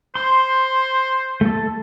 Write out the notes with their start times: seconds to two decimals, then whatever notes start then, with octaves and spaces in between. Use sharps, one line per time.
0.15 C5 C6
1.41 A3 A4